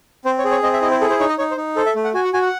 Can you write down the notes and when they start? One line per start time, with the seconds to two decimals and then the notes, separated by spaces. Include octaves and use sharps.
0.25 C4 C5
0.38 C#5
0.45 G#4
0.51 C#5
0.63 C4 D#5
0.73 E5
0.82 E4 D#5
0.91 C5
1.01 G#4 A4
1.10 C5
1.20 D#4 C#5
1.29 D#5
1.38 D#4 C#5
1.51 C5
1.57 D#4
1.76 A4 C5
1.86 E5
1.95 A3
2.04 F#5
2.14 F#4 G#5
2.24 F#5
2.34 F#4 G#5
2.42 F#5